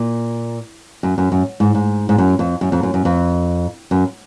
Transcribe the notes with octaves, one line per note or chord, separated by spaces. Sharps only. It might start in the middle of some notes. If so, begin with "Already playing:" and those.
Already playing: A#2
F#2
F#2
F#2
G#2
G#2
G#2
F#2
F2
F#2
F2
F#2
F#2
F2
F#2